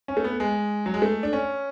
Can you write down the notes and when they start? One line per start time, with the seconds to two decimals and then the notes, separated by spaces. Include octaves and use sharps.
0.08 C#4
0.17 A3
0.24 B3
0.40 G#3
0.86 F#3
0.94 G#3
1.02 A3
1.23 D4
1.33 C#4